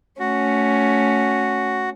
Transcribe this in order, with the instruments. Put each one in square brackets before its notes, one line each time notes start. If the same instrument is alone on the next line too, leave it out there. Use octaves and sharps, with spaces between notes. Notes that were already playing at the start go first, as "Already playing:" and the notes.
[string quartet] A3 C#4 [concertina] F#4